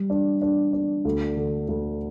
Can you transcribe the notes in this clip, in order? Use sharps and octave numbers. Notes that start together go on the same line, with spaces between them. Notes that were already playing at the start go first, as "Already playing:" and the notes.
Already playing: G3
D4
D4
D4
D2
D3
D2